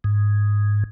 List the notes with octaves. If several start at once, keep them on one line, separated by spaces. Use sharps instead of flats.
G#2